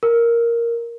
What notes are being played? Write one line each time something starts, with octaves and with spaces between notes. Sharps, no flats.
A#4